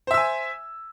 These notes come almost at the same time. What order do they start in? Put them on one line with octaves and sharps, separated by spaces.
C5 E5 E6 G#5